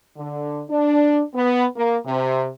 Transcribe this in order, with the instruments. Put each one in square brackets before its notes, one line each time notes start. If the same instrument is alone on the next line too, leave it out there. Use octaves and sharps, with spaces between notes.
[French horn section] D3
D4
B3
A#3
C3